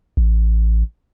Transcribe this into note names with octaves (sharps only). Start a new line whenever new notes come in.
A1